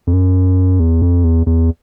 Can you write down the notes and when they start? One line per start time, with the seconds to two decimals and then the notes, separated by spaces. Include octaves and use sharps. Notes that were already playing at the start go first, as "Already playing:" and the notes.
0.07 F2
0.13 F#2
0.80 E2
1.02 F2
1.24 E2
1.46 E2